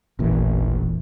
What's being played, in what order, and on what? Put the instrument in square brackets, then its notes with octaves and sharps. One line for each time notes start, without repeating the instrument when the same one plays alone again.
[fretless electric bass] E1 A#2 E3 [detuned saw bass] A1